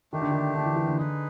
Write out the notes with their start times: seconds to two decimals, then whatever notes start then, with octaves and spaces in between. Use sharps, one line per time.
0.13 D#3 A3 D4 G4
0.22 D3
0.32 D#3
0.55 D3
0.66 E3
0.76 E3
0.87 D3
0.97 D#4 G#4 B4